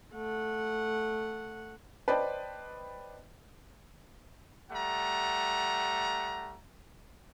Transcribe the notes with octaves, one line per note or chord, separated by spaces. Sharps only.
A3 F#5
B4 C5 D5 D#5 G5 A5
G3 A3 F#5 A#5